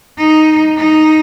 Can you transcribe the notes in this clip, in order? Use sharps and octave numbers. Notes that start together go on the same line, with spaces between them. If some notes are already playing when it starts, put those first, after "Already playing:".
D#4
D#4